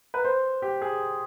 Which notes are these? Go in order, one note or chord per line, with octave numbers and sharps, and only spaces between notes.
B4
C5
G4
G#4